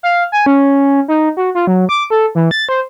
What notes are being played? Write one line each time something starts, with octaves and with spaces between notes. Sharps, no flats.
F5
G#5
C#4
D#4
F#4
F4
F#3
D6
A4
E3
A6
C5